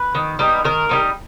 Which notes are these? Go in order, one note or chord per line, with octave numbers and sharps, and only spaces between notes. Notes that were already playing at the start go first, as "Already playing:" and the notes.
Already playing: B4
D#3
G3 B3 D#4
D#3 A#4
G3 B3 D#4